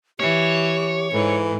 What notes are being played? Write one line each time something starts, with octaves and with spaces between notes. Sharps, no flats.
E3 G4 C#5
G#2 E3 A4